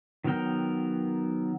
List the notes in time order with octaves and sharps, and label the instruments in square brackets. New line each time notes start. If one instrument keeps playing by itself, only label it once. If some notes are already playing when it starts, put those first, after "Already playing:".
[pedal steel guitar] D#3 F#3 B3 A#4 G5